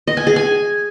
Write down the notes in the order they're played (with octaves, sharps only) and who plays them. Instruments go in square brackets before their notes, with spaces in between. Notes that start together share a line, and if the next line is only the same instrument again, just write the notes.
[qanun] D#5
G#5
G#4
G#5